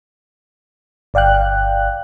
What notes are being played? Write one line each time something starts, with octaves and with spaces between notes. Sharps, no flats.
G1 D5 F5 G5 F#6